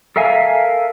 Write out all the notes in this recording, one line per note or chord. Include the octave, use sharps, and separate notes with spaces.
A4 A#4 E5 F5 G#5